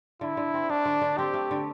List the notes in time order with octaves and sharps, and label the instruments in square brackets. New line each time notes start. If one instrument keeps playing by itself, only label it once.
[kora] D3 [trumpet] E4
[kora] D3
C4
[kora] A3 [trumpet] D4
[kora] D3
D3
[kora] C4 [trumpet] G4
[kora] A3
D3